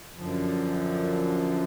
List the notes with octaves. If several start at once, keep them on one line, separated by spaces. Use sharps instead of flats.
F#2 D3 F3